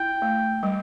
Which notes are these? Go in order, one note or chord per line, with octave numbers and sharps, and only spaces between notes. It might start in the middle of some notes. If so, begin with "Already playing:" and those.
Already playing: E4 G5
A3
G3